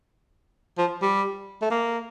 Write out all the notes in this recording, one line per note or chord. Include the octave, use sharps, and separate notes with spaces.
F3
G3
A3
A#3